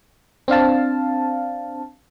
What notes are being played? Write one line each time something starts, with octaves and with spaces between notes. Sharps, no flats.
C4 D4 F5 A5